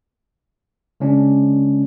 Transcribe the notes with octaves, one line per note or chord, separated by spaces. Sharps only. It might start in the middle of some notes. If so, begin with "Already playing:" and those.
C#3 G#3 C#4 D4